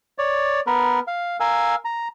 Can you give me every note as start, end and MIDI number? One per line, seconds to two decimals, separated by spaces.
0.18 0.60 73
0.18 0.60 74
0.67 1.00 59
0.67 1.00 70
0.67 1.00 71
1.08 1.37 77
1.40 1.75 70
1.40 1.75 77
1.40 1.75 80
1.40 1.75 88
1.85 2.08 82